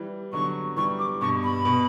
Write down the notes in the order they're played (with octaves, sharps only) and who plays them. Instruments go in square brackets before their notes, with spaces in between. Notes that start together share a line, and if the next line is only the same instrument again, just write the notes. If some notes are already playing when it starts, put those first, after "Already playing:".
Already playing: [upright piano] E3 G3
[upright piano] D3 F#3 [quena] C#6
[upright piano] E3 G3 [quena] C#6
[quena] D6
[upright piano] G2 B2 [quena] C#6
[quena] B5
[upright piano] B2